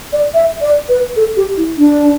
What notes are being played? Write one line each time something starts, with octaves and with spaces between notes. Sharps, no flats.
D5
E5
D5
B4
A4
G4
E4
D4